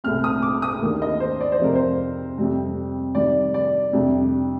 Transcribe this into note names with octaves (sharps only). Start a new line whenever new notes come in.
C2 A#2 A3 C4 F6
D#6
D6
D#6
D#2 D#3 A#3 D4
D#5
C5
D5
C5
F2 C3 F3 A#4
C5
F2 C3 G3 C4
C3 D#3 G3 D5
D5
F2 C3 G3 D4